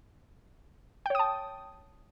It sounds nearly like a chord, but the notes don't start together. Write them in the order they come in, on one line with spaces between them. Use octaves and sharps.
G5 C#5 D#6 A5